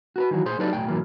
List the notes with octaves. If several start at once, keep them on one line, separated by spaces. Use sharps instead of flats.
F#4 A#4 B4
D#3 E3 F#3 F#4
A#2 G#4 C5 C6
F#3 D#4 G4 A4 B4 D5
B1 E2 A2 G5
G#2 B2 E3 F#3 A#3